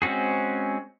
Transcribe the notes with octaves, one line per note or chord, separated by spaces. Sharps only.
G#3 C4 C#4 F#4 G#4